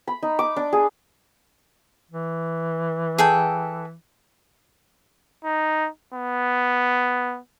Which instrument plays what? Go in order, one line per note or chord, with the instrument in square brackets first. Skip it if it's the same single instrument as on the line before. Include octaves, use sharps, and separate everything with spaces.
[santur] B5
D#4
D6
D4
G#4
[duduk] E3
[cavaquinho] G#4 A4 G5
[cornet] D#4
B3